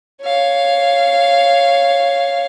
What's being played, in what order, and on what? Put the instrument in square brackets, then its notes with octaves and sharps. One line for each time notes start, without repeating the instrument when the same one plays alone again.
[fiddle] C#5 F5